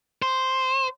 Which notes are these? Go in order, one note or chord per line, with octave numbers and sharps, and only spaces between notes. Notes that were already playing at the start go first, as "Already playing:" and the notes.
C5